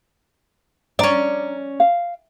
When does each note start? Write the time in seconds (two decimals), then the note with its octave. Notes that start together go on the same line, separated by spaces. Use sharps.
0.99 C#4 D4 D5 A#5
1.80 F5